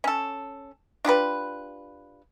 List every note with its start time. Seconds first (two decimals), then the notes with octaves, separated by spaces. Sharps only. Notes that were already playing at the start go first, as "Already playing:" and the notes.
0.04 C#4 A4
1.05 D4 F4 G4 B4